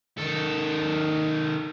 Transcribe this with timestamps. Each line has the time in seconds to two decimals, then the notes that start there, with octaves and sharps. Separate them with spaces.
0.18 D#3 A4